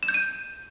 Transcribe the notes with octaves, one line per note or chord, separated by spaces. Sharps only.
E7
G6
D#7